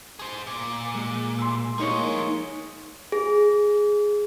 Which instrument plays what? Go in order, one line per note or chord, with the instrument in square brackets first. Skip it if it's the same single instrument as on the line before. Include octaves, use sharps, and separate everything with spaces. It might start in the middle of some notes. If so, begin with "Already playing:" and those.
[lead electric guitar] G#4 C5
A#2
[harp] G#3
C6 E6
[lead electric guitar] F3 G#4 [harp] A#3 D#4 C#5
[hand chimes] G#4